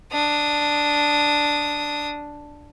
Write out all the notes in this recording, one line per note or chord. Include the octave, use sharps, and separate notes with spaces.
D4 D#6